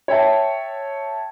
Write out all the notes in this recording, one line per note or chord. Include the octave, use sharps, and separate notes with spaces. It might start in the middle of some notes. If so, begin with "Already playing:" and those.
C#5 E5 G5 A5